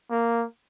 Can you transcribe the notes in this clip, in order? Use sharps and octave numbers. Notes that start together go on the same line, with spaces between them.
A#3